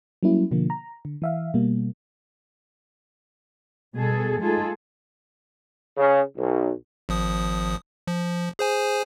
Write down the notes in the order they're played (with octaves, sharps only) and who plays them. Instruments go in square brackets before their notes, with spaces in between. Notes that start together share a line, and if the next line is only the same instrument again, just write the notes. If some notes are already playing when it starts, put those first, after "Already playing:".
[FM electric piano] F#3 G3 A#3 C#4 E4
B2 D3 F3 A#3
A#5
D3
E3 E5 F5
B2 G3 A#3
[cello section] B2 G3 B3 G#4 A4
G#3 A3 D#4 F4 G#4 A4
[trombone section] C#3
B1
[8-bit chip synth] G#1 F3 D#6
F3
G#4 C5 G#5